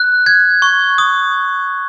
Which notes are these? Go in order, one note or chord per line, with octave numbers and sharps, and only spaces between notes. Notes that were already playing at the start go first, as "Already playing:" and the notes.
Already playing: F#6
G#6
C#6
D#6